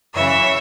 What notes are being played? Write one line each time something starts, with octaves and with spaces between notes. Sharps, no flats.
F#2 C#3 E3 C#5 E5